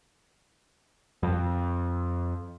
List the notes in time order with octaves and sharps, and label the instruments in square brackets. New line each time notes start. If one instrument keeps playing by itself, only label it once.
[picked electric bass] F2